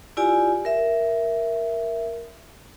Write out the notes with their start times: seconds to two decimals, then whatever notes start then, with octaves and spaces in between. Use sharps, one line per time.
0.17 E4 F4 G4 D5 G#5
0.65 A#4 E5